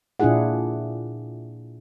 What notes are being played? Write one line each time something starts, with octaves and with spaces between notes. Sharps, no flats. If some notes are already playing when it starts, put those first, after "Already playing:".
A#2 D4 E4 F4 G#4 F#5